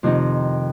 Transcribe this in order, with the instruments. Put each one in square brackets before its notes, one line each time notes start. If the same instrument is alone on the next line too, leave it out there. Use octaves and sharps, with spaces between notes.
[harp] F2 C3 D#3 C4 D#4